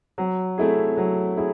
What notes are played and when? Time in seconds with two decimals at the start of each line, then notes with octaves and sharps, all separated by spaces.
0.18 F#3
0.58 A3 E4 G#4
0.97 F#3
1.37 E4 G#4